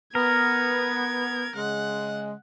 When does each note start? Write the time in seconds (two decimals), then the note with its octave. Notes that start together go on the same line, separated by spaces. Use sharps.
0.15 B3 A#4 G#6
1.56 C#3 G#3 F#5